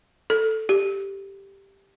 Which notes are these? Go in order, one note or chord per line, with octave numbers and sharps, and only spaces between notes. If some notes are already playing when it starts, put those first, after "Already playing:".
A4
G4